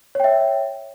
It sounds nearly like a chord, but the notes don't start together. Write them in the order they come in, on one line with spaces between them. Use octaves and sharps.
C#5 G5 E5